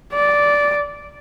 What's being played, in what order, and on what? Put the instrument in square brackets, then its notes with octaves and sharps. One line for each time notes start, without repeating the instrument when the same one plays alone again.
[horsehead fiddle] D5